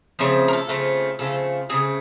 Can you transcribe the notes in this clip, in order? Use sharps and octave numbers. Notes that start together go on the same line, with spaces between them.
C#3 F3 A3 C4 C#5
A#4
A4
C#3 F3 A3 C4
C#3 F3 A3 C4 A4
C#3 F3 A3 C4 G#4